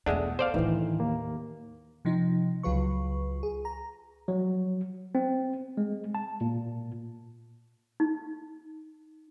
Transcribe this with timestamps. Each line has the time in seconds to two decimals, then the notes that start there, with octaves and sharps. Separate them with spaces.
0.06 E2 B2 G#3 A3 D4 F#5
0.39 A4 C5 D5 F5
0.54 A2 D#3 E3 D4 D#4
1.00 D#2 A#3
2.05 C3 F3 D#4
2.63 C#2 F#3 F4 B4 C#6
3.43 G#4
3.65 A#5
4.28 F#3
5.15 C4
5.77 G#3
6.15 A5
6.41 A#2
8.00 D#4